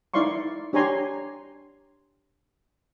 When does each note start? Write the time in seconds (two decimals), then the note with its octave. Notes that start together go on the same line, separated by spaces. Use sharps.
0.14 D#4 E4 D5 F5 C6 C#6
0.73 D4 G4 C#5 G#5 A#5 C6